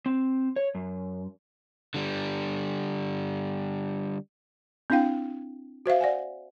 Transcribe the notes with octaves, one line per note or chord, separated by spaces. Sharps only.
C4
C#5
F#2
D3 G3
C4 D4 E4 F5 G5
F#4 C5 E5 F5
D5 F#5 G#5